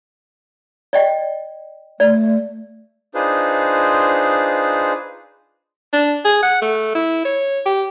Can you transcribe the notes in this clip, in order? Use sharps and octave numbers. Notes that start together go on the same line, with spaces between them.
D5 D#5 G5
A3 D5
D4 D#4 F4 G#4 B4 C5
D4
G#4
F#5
A3
E4
C#5
G4